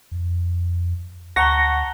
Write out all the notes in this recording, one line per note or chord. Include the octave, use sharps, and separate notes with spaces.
F2
D2 F#5 A5 A#5 C#6 A#6 G7